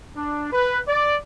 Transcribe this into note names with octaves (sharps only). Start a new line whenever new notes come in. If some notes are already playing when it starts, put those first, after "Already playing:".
D4
B4
D5